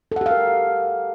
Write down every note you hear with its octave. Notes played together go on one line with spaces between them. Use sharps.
G4 A4 A#4 F5 F#5